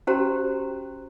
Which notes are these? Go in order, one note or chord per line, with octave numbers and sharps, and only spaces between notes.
C#4 F#4 G4 C5 A#5